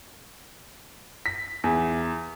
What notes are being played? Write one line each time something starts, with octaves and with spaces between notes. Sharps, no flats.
B6
E2